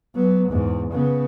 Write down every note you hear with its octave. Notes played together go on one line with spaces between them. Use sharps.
F#3 B3
E2 G#2
C#3 B3